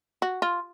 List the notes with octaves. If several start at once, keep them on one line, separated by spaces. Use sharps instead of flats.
F#4
F4